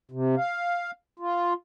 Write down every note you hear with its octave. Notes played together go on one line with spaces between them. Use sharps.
C3
F5
F4